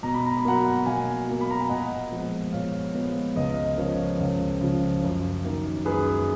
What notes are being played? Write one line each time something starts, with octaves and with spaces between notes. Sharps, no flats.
B2 A#5
B5
A#5
B5
F#3 A#3 F#5 A#5
B2 F5 G#5
F#3 A#3
B5
A#5
G#5
A#2 D#5 F#5
F3 G#3 B3
A#2 C#5 F5
F3 G#3 B3
C#2 B4 D#5
F5
D#5
C#3 F3 A#4 C#5
C#2
C#3 F3
F#2
D#3 A#3
F#2 G#4 B4